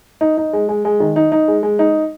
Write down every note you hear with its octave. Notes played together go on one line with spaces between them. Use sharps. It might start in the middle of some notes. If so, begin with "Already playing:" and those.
D#4
D#4
G#3
G#3
G#3
D#3
D#4
D#4
G#3
G#3
D#4